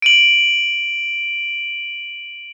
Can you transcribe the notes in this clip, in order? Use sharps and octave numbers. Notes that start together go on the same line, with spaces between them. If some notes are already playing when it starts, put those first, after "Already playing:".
D7 D#7 F#7